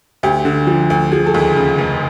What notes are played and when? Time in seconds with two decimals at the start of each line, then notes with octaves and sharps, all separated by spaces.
0.23 D2 G4
0.45 D3
0.67 F3
0.90 D2
1.12 F3 G#4
1.26 A4
1.34 D#2
1.39 G#4
1.56 C#3
1.78 F1